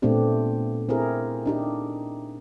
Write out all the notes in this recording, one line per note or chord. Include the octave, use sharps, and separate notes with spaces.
A#2 A3 B3 C4 D4 G4
C4 E4 G4 G#4 A#4
D4 D#4 G4